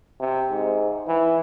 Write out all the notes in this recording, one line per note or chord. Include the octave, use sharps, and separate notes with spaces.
C3
G#2
E3